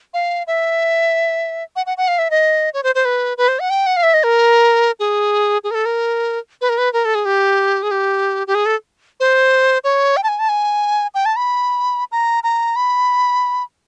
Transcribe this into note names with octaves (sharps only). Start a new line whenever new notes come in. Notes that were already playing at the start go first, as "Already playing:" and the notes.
F5
E5
F#5
F#5
F#5
F5
E5
D#5
C#5
C5
C5
B4
B4
C5
F#5
G5
F#5
F5
E5
D#5
A#4
G#4
G#4
A#4
A4
A#4
B4
A#4
B4
A#4
A4
G#4
G4
G#4
G4
G4
G#4
A4
C5
C#5
G5
A5
G#5
A5
G#5
G5
A5
B5
A#5
A#5
B5